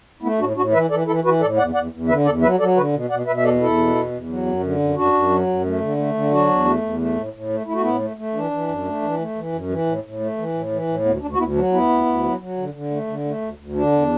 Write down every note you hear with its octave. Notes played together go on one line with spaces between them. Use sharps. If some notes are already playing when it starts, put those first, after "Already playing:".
A3 B3 E4
A2 D4 F#4
A2 D4 F#4
E3 B4 E5
E3 A4 D5
E3 E4 A4
E3 F#4 B4
A2 A4 D5
E2 D5 F#5
E2 D5 F#5
E2
D3 B4 E5
E2 A4 D5
F#3 B4 E5
F#3 A4 D5
D3 F#4 B4
B2
B2 D5 F#5
B2 B4 E5
E5
E2 A4 D5
E2 E4 A4
B2
E2
E2
F#3
F#2
D3
F#2
F#2 D4 F#4
F#2
F#3
F#2
A3
D3
A3
D3
F#3 D4 F#4
E2
A3
E2
A3
A2
A2
A3
A3 E4
F#4
A2 B3 E4
A3
A3
E3 D4
E3
F#2
A3
E3
A3
E3
F#2
E3
A2
A2
A3
E3
A2
E3
A2
D2 B3
D2 D4
F#4
D2 B3 E4
F#3 D4
D2 B3 E4
D2
D2
F#3
F#3
D3
D3
A3
D3
A3
D2
D2
D3 D4
E2